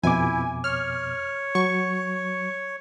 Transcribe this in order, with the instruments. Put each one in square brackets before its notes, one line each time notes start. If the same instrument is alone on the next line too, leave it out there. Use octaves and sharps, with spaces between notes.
[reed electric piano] F2 B2 D6 [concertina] E4 [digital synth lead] G#5
[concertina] C#5 [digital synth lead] F6
[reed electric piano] F#3 [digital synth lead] C#6